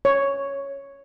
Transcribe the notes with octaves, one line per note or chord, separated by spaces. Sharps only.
C#5